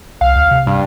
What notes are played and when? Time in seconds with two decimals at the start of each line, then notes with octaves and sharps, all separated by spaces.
0.21 C2 F5
0.35 D2
0.51 C3
0.67 G2